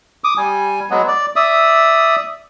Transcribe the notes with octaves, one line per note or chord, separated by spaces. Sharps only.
D6 D#6
G3 G#5
F#3 G#3 B3
D5
D5 E5 D#6